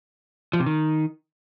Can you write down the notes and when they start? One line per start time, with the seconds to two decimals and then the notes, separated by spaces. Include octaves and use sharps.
0.53 F3
0.60 C3
0.66 D#3